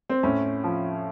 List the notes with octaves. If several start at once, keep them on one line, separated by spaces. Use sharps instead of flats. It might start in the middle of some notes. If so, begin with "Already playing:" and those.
C4
A2 C#4
F3